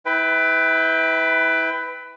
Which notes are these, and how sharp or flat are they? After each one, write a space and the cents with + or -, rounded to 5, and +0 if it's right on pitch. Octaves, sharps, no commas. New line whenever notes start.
E4 -25 B4 +20 G5 +15